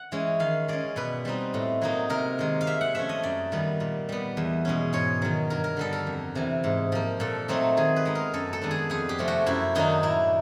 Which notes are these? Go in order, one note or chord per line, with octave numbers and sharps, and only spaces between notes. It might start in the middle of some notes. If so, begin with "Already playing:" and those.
Already playing: F#5
E3 G#3 C#4
D#3 F5
G#3 C#4 D5
B2 B4
G3 C4 D#4
A2
F#3 A#3 D#4
C3 A#4
D#3 G#3
F5
C3 E5
F#5
F3 A3 C#4 E5
D#5
F#2 D5
D#3 G3 B3
A#2
G3 B3
E2
B2 G#3 C#4
G#2 C#5
D#3 F#3
G2 A#4
A#4
D3 G3 B3 A4
A#4
F2
C3 E3
G#2
F3 A#3
A#2 A4
F#3 A3 C4 D#4
D#3 G#4
B4
G#3 B3 D#4
A#4
F#2 A4
A4
D#3 G#3 B3 D4
G#4
F2 G#4
G4
C3 F3 A3
F#4
F#2 E4
D#3 F#3 A#3 D4 D#4
A2 E4